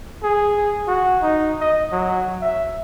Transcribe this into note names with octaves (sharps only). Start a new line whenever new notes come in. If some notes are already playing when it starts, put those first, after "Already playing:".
G#4
F#4
D#4
D#5
F#3
E5